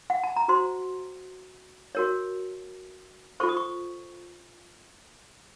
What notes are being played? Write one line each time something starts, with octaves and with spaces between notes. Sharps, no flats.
F#5
A5
A#5
F#4 C5 C6
F#4 A#4 C#5
F4 A4 C5 C#6
D#6
C#6